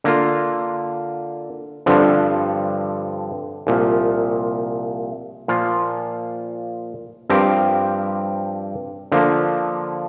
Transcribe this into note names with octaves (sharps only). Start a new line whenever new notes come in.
D3 A#3 F4
G2 D3 F3 C4
C2 A#2 F3
A#2 F3 A#3 F4
G2 F3 C4 G4 A#4
D3 F3 A#3